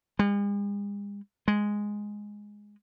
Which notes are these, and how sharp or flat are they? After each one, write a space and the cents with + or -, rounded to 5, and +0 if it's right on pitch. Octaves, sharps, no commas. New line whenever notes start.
G#3 -45
G#3 -5